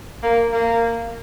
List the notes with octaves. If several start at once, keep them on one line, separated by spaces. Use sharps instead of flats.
A#3
A#3